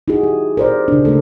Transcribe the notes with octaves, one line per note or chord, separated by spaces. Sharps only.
D#4 E4 F#4 G#4
G4
A#4 C5 D5
C#3 D4
C#3 G#3 A3 A4